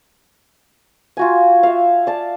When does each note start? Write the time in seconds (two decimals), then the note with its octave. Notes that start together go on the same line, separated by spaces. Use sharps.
1.17 F4 F#4 G#5
1.63 E5 F5
2.07 D5 A5